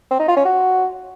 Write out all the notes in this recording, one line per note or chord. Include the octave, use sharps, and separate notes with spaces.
C4
D#4
F4
C#4
F#4